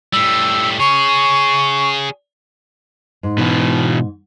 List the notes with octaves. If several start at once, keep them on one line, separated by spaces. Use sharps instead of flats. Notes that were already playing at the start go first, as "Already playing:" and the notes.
A2 G3 E6
G#4 C#5 C#6
G#2
B2 D#3 E3